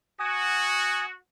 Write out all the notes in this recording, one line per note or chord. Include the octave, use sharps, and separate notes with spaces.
F#4 G#5 D#6